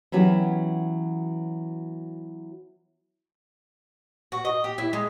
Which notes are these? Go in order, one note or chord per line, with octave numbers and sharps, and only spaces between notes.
E3 F#3 B3 C#4 G4
F#4
D#5
G4
E4
G#3